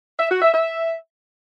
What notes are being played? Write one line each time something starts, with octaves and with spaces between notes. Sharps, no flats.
E5
F#4
E5
E5